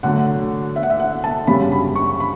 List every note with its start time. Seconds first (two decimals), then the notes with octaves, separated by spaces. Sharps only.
0.03 D3 F#3 A3 F#5
0.76 E5
0.83 F#5
0.90 E5
1.00 F#5
1.24 A5
1.47 F#2 C#3 G3 B5
1.72 B5
1.96 C#6
2.20 B5